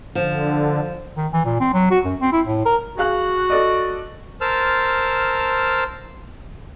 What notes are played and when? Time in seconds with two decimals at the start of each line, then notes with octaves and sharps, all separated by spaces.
0.15 D3 F3
1.17 D#3
1.33 E3
1.45 A#2
1.61 C4
1.73 F#3
1.91 F#4
2.05 F#2
2.21 C4
2.32 E4
2.47 A2
2.66 A#4
2.98 F#4 G#4 F5 F#6
3.50 A4 D5 D#5
4.41 A#4 C5 A5 E6 F6